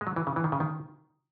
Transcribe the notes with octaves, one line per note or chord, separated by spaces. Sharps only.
G#3
F#3
E3
C#3
E3
D#3
C#3
D#3